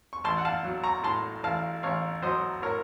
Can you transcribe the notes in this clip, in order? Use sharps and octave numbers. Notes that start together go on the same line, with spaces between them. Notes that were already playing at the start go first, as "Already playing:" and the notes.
C#6
A1 A5 C6
F#5
F5 A5
F#3
A#5 C#6
A2 A5 C6
A1 F5 A5
A1 C#5 F5
F#3 C5 D#5
A2 A#4 C#5